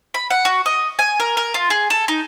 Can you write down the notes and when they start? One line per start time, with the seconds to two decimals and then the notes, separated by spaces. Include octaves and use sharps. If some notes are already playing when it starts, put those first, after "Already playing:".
0.14 B5
0.30 F#5
0.45 F#4
0.66 D#5
0.99 G#5
1.20 A#4
1.37 A#4
1.54 F4
1.70 G#4
1.90 A4
2.08 D#4